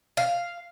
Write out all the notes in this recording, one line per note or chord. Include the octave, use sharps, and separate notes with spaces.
F5